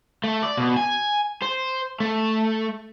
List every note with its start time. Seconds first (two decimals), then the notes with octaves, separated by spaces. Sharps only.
0.24 A3
0.43 D5
0.57 B2
0.77 G#5
1.42 C5
2.00 A3